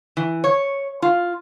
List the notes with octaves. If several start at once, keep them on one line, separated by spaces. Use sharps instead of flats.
E3
C#5
F4